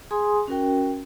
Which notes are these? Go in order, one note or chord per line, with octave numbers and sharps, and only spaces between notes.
G#4 G#5 C6 D#6
C#4 F#4 A#4 G5